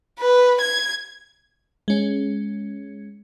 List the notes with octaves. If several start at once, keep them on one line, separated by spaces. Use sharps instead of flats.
B4
G#6
G#3 C#4